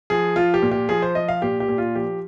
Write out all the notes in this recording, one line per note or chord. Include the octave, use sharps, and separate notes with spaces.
F3 G#4
F3 F4
G4
A#2
G4
F3 G#4
C5
F3 D#5
F5
A#2 G4
G4
A#2
F4
F3 G4